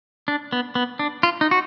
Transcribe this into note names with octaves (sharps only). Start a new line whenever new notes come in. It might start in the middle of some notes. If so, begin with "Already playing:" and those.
D4
B3
B3
D4
F4
D#4
F#4